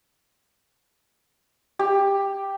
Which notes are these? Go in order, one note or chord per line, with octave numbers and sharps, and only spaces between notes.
G4